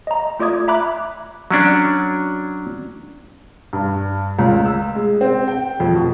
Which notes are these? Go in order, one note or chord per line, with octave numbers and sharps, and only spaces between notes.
D#5 A#5
A3 F4 D5 D6 D#6 G#6
E5 A#5 B5 D6 F#6
F#3 C#4 D4
G2
C#2
E6
G#3
C4
G5
F2
B2